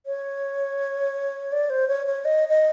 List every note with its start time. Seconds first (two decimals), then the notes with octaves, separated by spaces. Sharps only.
0.06 C#5
1.52 D5
1.70 C5
1.88 C#5
2.06 C#5
2.25 D#5
2.49 D#5